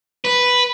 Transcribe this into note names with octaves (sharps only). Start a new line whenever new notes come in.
B4